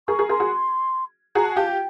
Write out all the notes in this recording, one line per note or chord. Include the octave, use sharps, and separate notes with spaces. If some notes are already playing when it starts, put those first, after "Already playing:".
G#4 A#4 C#6
G#4 A#4
G#4 A#4 C6
F#4 G#4
F#4 G#4 A#5
A5
F4 G4 A5
G5